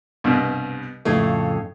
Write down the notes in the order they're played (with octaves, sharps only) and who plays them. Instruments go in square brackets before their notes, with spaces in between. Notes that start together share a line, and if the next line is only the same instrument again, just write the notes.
[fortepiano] C2 G2 B2
[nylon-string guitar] F2 A2 C#3 [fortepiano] A3